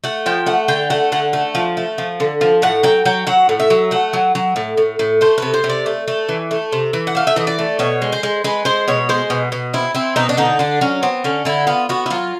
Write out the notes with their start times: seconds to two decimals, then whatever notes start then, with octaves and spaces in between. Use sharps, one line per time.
0.04 A3 F#5
0.26 F3 G5
0.46 A3 F#5
0.68 D3 G5
0.90 A3 F#5
1.12 D3 F#5
1.33 A3
1.55 F3
1.77 A3
1.98 F3
2.20 D3
2.41 F3
2.62 A2 F#5
2.83 F#3 G5
3.05 F#3 G5
3.27 F#3 F#5
3.49 A2
3.60 E5
3.70 F#3
3.91 A3 F#5
4.13 F#3
4.35 F#3
4.56 A2
4.77 A2
4.99 A2
5.21 A3 C5
5.38 C3 B4
5.54 C5
5.64 C3
5.69 D5
5.86 A3
6.08 A3
6.29 E3
6.51 A3
6.72 C3
6.93 E3
7.07 F#5
7.15 A3 F5
7.27 E5
7.36 E3 D#5
7.47 D5
7.59 A3
7.79 B2 C#5
8.02 G#3
8.12 C5
8.23 G#3
8.44 G#3 B4
8.65 G#3 C5
8.88 B2 C#5
9.09 G#3 C5
9.30 B2
9.52 B2
9.74 C4 E4
9.95 C4 E4
10.16 B2 D#4
10.29 D4
10.37 D3 D#4
10.59 D3 D4
10.81 F#3 C#4
11.03 B3 C4
11.24 D3 C#4
11.45 D3 E4
11.67 B3 F4
11.89 B3 F#4
12.06 E4
12.10 F#3 F4